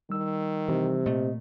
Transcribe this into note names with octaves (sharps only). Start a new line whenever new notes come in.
D#3 G3 E6
C3 E3
A#2 A3 D#5